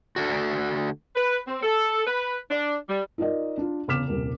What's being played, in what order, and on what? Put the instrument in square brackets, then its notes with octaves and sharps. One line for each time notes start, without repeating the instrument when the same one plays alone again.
[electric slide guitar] D3 A3 D4 F#4
[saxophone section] B4
C4
A4
B4
D4
G3
[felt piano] D#4 F4 A#4 D5 D#5
D4 F4
E2 C#3 D6 F6 B6 E7
D#1 C2 A#4